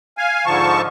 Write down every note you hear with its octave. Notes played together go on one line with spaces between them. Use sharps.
F5 G#5
G#2 D3 F3 A5 C#6